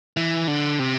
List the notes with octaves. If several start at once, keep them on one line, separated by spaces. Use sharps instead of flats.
E3
D3
C3